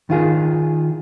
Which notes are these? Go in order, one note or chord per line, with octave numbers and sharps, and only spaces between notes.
D#3 F4 G#4